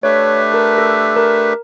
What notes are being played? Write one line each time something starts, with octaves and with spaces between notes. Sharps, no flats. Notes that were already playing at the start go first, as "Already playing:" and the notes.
A3 D4 G4 B4 C#5 E5
A#4
A4
A#4